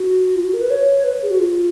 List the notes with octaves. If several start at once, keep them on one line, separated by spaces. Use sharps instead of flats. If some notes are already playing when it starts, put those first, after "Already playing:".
Already playing: F#4
F4
F#4
A#4
B4
C#5
B4
G#4
F#4
F4